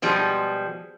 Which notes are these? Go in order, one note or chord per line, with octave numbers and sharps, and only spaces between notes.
B2 F3 G3 G#3